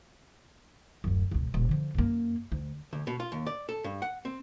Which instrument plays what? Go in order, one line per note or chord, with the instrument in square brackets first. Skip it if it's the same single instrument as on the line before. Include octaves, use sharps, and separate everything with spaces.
[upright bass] D1 F#2
E1 C#2
D#1
D3 F3
F#2 A#3
D2
[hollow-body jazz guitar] D2
B2
F4
D#2
D5
A4
G2
F#5
C4